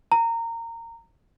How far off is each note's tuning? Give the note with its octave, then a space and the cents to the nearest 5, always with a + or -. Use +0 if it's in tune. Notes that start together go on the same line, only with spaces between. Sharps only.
A#5 -20